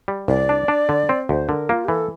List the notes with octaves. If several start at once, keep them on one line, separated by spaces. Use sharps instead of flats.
G3
C2 D5
D4
D4
D3
C4
D2 C5
D3 A#4
A#3 F4
G4
E3 A4